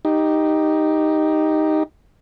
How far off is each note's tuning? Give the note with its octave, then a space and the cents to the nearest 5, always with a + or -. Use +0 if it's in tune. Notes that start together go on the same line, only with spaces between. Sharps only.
D#4 +0 G4 +0